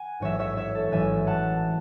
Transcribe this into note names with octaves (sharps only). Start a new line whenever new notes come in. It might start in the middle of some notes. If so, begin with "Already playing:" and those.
Already playing: F#5 G#5
A1 G#2 F#3 C#5 E5
C#5 E5
C#5 E5
A4
A1 G#2 F#3 E5 G#5
F#5 A5